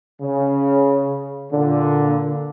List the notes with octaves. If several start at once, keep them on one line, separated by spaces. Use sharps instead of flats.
C#3
A#2 D3